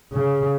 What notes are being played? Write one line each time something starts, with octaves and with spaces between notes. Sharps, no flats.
C#3